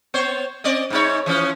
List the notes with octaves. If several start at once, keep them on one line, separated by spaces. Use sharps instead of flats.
B3 C5 C#5
C4 D5 D#5
G#2 D#4 C#5
E3 F3 C#4